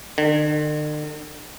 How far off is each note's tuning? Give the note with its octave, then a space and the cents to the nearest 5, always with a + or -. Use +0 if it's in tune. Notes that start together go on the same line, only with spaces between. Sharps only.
D3 +45